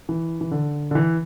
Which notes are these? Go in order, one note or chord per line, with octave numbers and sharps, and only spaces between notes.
E3
E3
D3
D3
E3